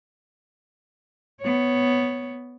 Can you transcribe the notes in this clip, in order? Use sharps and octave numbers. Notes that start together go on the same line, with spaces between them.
B3 C#5